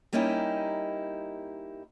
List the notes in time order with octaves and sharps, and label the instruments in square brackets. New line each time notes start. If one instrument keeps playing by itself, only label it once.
[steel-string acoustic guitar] G3 A#3 C#4 D#4 E4 G4